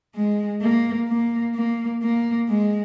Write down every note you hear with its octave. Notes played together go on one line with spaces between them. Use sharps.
G#3
A#3
A#3
A#3
A#3
G#3